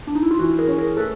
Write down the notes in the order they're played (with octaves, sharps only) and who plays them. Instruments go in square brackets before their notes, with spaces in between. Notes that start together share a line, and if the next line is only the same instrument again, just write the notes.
[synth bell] D4
D#4
E4
F4
[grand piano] E3 [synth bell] E4 F#4
[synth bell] G#4 A#4
[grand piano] C#4
[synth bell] G#4 A#4
[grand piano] A3 [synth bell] A4 B4